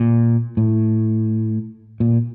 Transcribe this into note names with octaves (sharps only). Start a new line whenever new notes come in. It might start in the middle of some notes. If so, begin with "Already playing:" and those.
Already playing: A#2
A2
A#2